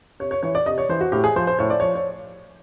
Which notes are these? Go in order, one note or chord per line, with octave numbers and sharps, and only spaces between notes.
C3 C#5
C#5
E3 C#5
D5
C3 D#5
C#5
E3 C5
F#4
A2 G4
G#4
F3 C5
C5
A2 C#5
D5
F3 C#5
C#5